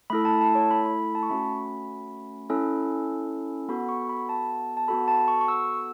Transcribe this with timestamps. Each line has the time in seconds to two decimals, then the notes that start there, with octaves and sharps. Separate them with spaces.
0.10 A3 E4 A4 B5
0.25 A5
0.41 A5
0.55 C#5
0.71 B5
0.85 B5
1.15 A5
1.23 C#6
1.29 A3 C#4 F#4 B5
2.50 C#4 E4 A4
3.68 B3 F#4 A4 B5
3.89 C#6
4.09 B5
4.29 A5
4.77 A5
4.88 B3 F#4 A4 B5
5.08 A5
5.28 C#6
5.41 C#6
5.48 E6